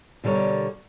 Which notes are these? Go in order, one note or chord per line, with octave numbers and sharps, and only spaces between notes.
B2 D3 G3 A#4 C#5